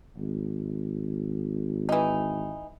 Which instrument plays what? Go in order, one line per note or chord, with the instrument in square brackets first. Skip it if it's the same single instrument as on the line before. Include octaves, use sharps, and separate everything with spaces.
[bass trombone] G#1
[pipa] E3 D#4